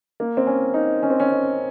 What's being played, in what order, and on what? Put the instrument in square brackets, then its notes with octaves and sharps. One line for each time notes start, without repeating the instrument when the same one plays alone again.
[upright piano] A#3
C4
C#4
D#4
C#4
C4
C#4
C4